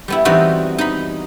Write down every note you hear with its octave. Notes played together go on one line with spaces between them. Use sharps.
G3 B3 E4
E3 G3 B3 C4 D#4 F#4
D#4 B5